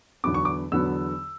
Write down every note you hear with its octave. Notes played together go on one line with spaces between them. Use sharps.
E2 D3 F#3 B3 D6
C#6
D6
E2 D3 F#3 B3 E6